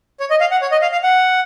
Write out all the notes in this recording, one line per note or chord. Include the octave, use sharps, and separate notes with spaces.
C#5
D#5
F5
F#5
C#5
D#5
F5
F5
F#5